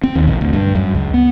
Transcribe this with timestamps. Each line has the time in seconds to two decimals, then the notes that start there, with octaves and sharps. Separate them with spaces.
0.04 C4
0.15 D#2
0.27 A#1
0.41 D2
0.53 G2
0.75 F#2
0.95 C#2
1.14 B3